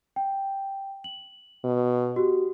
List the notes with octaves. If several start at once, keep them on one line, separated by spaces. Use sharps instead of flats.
G5
F#7
B2
F#4 G4